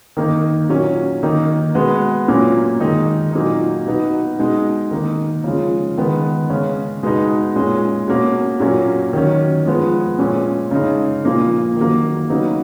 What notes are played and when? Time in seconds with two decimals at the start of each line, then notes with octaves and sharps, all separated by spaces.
0.17 D#3 A#3 D#4
0.70 A#2 F#3 C#4
1.23 D#3 A#3 D#4
1.75 B2 G#3 B3
2.28 A#2 F#3 A#3 C#4
2.80 D#3 G#3 D#4
3.33 A#2 F#3 A#3 D#4
3.86 B2 F#3 B3 D#4
4.39 B2 G#3 D#4
4.91 D#3 A#3 D#4
5.44 C#3 F3 G#3
5.98 D#3 G#3 B3
6.50 C#3 G#3 C#4
7.03 B2 G#3 B3 D#4
7.56 A#2 G#3 C#4
8.08 B2 A#3 C#4
8.60 A#2 F#3 A#3 C#4
9.13 D#3 F#3 C#4
9.66 F3 G#3 B3
10.19 A#2 G#3 C#4
10.71 C#3 G#3 D#4
11.25 A#2 F3 A#3
11.77 D#3 F#3 A#3
12.30 C#3 F#3 B3 D#4